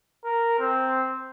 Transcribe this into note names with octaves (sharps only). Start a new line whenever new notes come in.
A#4
C4